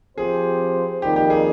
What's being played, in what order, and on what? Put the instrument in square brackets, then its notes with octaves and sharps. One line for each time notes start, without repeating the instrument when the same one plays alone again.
[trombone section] F3 C4 G4 C5 [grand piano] G#4
[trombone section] F2 D#3 G3 A#3 D#4 [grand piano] G4
[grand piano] G4
G#4